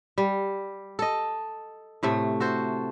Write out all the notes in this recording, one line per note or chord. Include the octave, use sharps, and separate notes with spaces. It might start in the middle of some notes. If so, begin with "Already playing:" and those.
G3
A4 D#5
A2 C3 A3
F#4 A4 C5